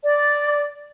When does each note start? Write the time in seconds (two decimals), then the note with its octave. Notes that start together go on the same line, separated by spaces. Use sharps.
0.04 D5